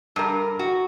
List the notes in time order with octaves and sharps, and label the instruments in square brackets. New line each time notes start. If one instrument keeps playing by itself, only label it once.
[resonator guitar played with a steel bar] G2 A#4
F#4